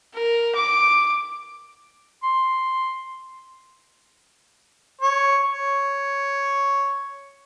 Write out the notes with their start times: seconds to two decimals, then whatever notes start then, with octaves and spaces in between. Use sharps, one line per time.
0.15 A#4
0.56 D6
2.23 C6
5.01 C#5
5.49 C#5